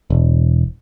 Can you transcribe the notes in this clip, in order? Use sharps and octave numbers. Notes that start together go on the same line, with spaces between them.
E1